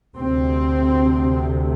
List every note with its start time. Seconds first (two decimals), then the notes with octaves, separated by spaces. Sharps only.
0.14 D2 C3 C4